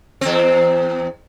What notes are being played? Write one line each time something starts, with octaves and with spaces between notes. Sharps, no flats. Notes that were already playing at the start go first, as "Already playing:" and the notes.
E2 C4